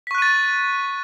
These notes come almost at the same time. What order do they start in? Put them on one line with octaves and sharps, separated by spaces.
B6 C#6 F#6 D#7 A6